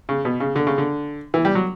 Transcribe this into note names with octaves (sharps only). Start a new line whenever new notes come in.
C#3
B2
C#3
D3
C#3
D3
E3
G3
F#3